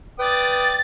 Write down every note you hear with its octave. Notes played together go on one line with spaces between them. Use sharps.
B4 D5 G5 D#6 A6